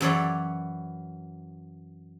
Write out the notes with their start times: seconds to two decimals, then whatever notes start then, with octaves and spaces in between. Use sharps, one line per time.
0.01 F#2 E3 C#5 D5